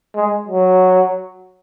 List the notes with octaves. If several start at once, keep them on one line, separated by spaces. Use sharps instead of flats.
G#3
F#3